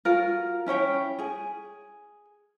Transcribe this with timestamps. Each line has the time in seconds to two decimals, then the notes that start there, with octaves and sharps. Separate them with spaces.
0.05 F4 F#4 A#4
0.66 C#4 E4 C#5 G5
1.19 G#4 G#5